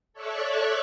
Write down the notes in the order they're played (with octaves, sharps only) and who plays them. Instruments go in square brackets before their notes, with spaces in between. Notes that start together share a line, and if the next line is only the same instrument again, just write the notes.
[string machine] A4 C#5 D5 E5 C#6 F#6